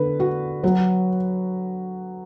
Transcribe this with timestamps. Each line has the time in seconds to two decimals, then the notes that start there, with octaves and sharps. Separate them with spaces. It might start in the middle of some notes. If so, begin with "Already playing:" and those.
Already playing: D3 B4
0.20 F#4
0.64 F#3